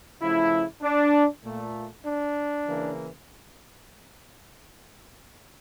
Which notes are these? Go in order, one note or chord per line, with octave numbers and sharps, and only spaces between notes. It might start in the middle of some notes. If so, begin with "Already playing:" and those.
C#3 F3 A3 E4
D4
A#2 A3
D4
C#3 E3 A#3